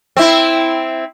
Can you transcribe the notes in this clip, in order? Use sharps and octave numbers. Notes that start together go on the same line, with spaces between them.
C4 E4